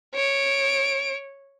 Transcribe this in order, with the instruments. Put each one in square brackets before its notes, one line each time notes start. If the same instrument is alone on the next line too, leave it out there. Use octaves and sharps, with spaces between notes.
[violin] C#5 D7